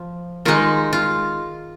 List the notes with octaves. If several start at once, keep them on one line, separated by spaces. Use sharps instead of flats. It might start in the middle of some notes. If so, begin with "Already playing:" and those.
Already playing: F3
D#3 G#3 D#4 F4
F4